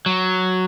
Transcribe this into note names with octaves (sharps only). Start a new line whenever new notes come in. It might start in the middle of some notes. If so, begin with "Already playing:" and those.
F#3